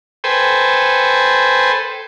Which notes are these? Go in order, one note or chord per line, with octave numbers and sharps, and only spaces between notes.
A4 B4 C5 G5 G#5